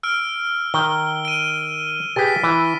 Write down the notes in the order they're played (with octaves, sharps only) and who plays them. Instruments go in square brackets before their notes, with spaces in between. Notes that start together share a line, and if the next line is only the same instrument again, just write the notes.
[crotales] E6 F6 D7
[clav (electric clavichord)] D#3 [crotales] G7
[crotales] D7 D#7
[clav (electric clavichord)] G4 G#4 B4 [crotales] A6 B6
[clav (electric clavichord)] E3